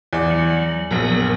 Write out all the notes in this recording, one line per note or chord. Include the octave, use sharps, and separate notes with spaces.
E2 D5
F#3
A#1 F#2 A#2 B3 A#4